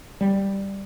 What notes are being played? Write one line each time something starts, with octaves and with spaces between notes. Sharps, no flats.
G3